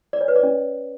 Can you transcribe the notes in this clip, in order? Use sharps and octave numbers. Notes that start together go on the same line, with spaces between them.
D5
C#5
B4
D5
C#4